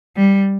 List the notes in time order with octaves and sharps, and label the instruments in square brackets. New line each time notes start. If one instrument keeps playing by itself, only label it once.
[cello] G3